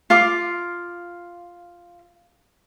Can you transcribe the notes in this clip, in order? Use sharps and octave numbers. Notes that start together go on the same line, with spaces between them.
F4 F5 D6